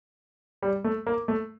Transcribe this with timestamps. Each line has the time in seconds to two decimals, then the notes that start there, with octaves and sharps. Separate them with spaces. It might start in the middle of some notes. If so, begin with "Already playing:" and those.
0.62 G3
0.84 A3
1.06 A#3
1.28 A3